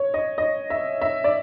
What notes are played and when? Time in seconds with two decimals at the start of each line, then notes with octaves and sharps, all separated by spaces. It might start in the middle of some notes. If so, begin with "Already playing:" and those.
Already playing: C#5
0.14 D#5
0.38 D#5
0.70 E5
1.01 E5
1.24 D5